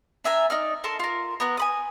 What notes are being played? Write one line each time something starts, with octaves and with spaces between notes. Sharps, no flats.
D4 E5 G#5 A#5
D#4 D5 F6
A4 A#4 A5 C6
F4 A#4
B3 A#4 F#6
G#5 B5 D#6